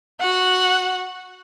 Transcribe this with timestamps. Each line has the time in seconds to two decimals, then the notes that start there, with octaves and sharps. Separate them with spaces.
0.20 F#4 F#5